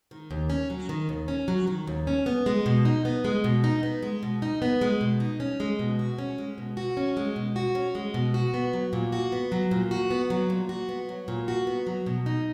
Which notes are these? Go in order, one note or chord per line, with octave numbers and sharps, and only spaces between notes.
D#3
D#2
C#4
F#3
D#3
D#2
C#4
F#3
D#3
D#2
C#4
B3
G#3
B2
D#4
B3
G#3
B2
D#4
B3
G#3
B2
D#4
B3
G#3
B2
D#4
C#4
G#3
B2
F#4
C#4
G#3
B2
F#4
C#4
G#3
B2
F#4
C#4
G#3
B2
F#4
B3
F#3
A#2
F#4
B3
F#3
A#2
F#4
B3
F#3
A#2
F#4
B3
F#3
A#2
F#4
B3
F#3
B2
D#4